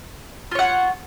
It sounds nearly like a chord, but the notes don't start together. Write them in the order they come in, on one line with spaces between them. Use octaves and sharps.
F4 C#5 F#5